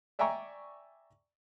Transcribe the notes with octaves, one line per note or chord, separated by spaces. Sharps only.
D5 E5 G5 G#5 A#5 C#6